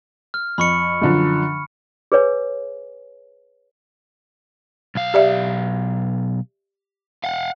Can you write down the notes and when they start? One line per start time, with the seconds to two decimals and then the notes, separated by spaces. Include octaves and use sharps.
0.34 F6
0.58 F2 B5 C#6 C#7
1.02 F#2 D3 F3
2.12 G#4 B4 C#5 G#5
4.95 B1 F5
5.14 G4 D5 E5
7.24 F5 F#5